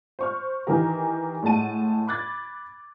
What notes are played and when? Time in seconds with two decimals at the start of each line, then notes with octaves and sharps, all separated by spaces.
0.19 C5 C#6 F6
0.67 D#3 E3 G4 A#4
1.43 A2 G#3 F#5 A5 D#7
2.07 B5 D6 F#6 G#6 A6